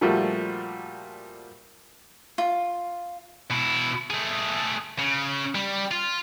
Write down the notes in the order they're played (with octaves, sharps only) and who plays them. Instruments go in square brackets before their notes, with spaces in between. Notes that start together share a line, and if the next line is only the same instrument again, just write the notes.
[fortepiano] A#2 F3 G3 A3 F4 F#4
[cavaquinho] F4
[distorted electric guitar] B2 E4
A3 G#4
C#3
G3
F4